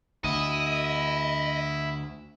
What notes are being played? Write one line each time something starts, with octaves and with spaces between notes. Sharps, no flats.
D2 E4 D#5